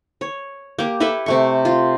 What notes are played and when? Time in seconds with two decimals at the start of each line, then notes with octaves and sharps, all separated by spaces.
0.21 C#5
0.79 A#3 G4
1.00 E4 A4 B4 E5
1.26 C3 A3 C#6
1.65 F4